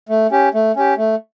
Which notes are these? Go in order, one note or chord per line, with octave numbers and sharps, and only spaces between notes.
A3
C#4 G4
A3
C#4 G4
A3